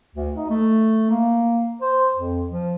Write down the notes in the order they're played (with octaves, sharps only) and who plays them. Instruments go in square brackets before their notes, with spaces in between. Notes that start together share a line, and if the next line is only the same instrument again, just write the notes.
[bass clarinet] D2
D#4
A3
A#3
C5
F2
F3